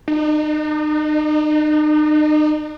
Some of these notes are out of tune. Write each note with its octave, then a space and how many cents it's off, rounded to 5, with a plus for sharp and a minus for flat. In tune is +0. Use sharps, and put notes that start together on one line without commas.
D#4 -40